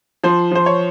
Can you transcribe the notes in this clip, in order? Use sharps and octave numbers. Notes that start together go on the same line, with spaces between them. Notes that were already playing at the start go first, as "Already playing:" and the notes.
F3 C5
F3 C5
C#5